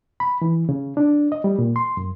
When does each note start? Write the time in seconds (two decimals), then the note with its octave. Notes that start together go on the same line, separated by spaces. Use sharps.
0.20 B5
0.42 E3
0.69 C#3
0.97 D4
1.32 D#5
1.44 G3
1.59 A#2
1.76 C6
1.97 F#2